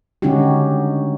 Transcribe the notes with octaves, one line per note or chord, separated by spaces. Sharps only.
D3 G#3 C#4 D#4 F#4 G4